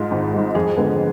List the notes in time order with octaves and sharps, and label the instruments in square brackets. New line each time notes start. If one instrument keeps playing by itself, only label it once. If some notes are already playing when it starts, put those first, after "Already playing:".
Already playing: [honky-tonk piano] G#2 G#3 [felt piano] F4
[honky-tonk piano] G#1
G#2 G#3
[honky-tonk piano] F2 [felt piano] G#4
[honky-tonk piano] D3 G#3 B3